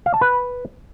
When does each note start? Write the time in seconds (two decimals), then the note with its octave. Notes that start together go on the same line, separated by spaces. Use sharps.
0.06 F5
0.14 A5
0.21 B4